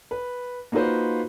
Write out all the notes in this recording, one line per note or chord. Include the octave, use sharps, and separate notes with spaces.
B4
A#3 D#4 F4 F#4 B4 C5